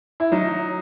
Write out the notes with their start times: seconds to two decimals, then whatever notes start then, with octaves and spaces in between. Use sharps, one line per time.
0.20 E4
0.32 F#3 D#4